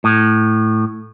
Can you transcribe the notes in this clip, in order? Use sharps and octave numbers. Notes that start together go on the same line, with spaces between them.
A2